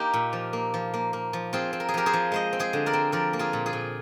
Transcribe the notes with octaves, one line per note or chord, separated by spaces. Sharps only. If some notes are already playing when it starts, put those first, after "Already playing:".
Already playing: A#3 D#4 G4
A#2
F3
A#3
F3
A#3
A#3
F3
C4 F4 G#4
C4
A#4
G#4
F3 G4 A#4
G#4 C5
F3
G#3 C5 D#5
C4
G#4 C5
D3
A#4 D5
C4
F3 A#4 D5
A#3
F4 G#4
A#2
F4 G#4
A#2